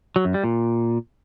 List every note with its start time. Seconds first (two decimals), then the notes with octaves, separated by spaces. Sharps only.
0.16 F#3
0.25 F#2
0.34 G3
0.44 A#2